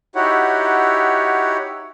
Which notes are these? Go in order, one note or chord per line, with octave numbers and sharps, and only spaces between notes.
D#4 E4 F#4 G4 C#5 F#5